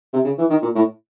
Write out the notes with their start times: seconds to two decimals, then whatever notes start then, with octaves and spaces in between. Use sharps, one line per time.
0.13 C3
0.24 C#3
0.38 E3
0.49 D#3
0.62 A#2
0.75 A2